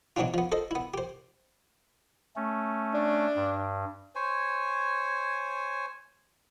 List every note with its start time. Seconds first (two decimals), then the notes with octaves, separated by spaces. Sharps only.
0.16 B2 E3 F#3 C4 D4 F4
0.34 F3 B3
0.52 A4 C5 D#5
0.71 B3 E4
0.94 G4 C5
2.36 A3 C#4
2.94 D4
3.36 G2
4.15 C5 C#5 G#5